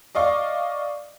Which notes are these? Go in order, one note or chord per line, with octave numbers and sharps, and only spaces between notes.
D5 D#5 F5 C#6 D6